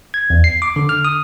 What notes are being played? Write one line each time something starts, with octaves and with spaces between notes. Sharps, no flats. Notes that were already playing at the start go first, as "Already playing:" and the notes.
G#6
E2
C7
D6
D3
F6
D#6